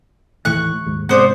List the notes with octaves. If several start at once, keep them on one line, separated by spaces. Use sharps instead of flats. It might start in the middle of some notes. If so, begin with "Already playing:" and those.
D#2 A2 E3 C#6 F#6
D#2 G#2
G#2 C3 B3 C5 D5